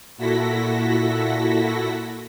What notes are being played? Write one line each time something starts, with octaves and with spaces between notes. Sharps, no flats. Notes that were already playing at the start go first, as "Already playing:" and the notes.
A#2 E4 F#4 A4 A#6 B6